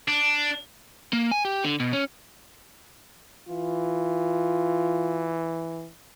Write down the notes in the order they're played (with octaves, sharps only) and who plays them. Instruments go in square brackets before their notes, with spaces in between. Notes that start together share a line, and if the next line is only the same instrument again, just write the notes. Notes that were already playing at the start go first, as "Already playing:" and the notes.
[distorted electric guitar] D4
[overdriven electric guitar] A#3
G#5
G4
D3
B2
C#4
[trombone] E3 [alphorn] F4